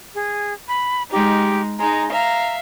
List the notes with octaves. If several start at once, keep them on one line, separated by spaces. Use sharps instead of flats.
G#4
B5
G#3 D#4 G4
G#3 D#4 A#5
E5 F5 A#5